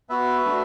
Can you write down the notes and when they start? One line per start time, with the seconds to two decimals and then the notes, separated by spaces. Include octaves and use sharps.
0.09 B3 F#4 B4 E5
0.45 A3 D4 F#4